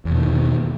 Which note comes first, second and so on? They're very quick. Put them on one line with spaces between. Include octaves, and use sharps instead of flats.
E2 B2 D#3